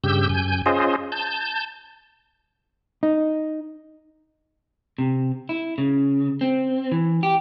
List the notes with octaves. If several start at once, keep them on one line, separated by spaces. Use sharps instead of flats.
G2 C#3 G4 E6 G6
F#2 G#5 G6
C#4 F4 G#4 C5 D#5
A5 G6
D#4
C3
E4
C#3
C4
E3
G4